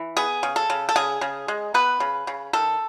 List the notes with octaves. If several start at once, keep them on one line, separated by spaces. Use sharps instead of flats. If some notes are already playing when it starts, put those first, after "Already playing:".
Already playing: E3
B3 G#4
C#3
A4
C#3
A4
C#3 G#4
C#3
G#3
B3 B4
C#3
C#3
D#3 A4